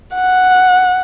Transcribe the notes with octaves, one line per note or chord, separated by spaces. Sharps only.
F#5